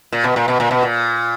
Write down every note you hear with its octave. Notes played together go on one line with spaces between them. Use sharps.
A#2
B2
A#2
B2
A#2
B2
A#2